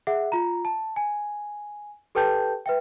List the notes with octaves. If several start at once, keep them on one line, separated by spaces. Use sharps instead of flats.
G#4 E5 F#5
F4 A#5
A5
G#5
G4 A4 B4 G5 A5 G6
B4 E5 G5